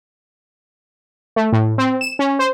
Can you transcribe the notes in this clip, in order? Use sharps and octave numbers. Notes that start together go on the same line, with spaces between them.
A3
A2
C4
E7
C#4
C5